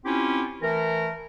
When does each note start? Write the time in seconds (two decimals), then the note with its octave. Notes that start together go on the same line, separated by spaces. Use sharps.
0.05 C4 C#4 E4 F4 G4
0.62 E3 A3 A#4